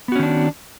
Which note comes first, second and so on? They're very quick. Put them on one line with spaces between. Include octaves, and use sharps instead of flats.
B3 F#4 C#4 D#3 D4